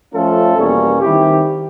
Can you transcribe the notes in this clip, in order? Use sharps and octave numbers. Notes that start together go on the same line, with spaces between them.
F3 A3 C#4 F4 A4
E2 B2 G3 A#3 C#4
D#3 G3 C4 E4 G4